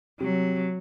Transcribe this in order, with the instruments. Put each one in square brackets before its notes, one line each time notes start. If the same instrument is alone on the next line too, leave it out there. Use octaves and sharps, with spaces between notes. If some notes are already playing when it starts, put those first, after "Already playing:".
[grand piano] C3 [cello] F#3